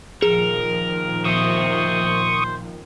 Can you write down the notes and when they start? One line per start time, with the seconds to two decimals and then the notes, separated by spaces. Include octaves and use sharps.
0.22 A#2 D#3 F3 G#4 A#4
1.25 C5 E5 C#6 D#6